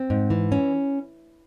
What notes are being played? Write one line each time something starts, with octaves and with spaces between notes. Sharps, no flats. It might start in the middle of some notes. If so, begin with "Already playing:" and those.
Already playing: C4
G#2
E3
C#4